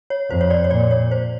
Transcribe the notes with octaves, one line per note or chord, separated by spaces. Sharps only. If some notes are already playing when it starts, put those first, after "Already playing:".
C#5
F2 C5
C#5
D5
C#5
A#2 D5
C#5
C5